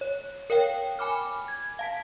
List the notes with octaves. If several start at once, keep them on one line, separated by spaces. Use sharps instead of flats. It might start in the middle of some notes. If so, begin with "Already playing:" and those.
C#5
A#4 C#5 F5 G5
G#5 B5 D6 F6
G#6
F5 A5 B6